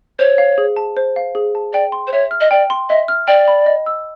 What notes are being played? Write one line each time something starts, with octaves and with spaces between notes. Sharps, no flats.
C5 C#5
F5
G#4
A5
C5
F5
G#4
A5
D5 G5
C6
C5
C#5 E5
F6
D#5
D5 G5
C6
D#5 E5
F6
D5 G5
B5
D#5
E6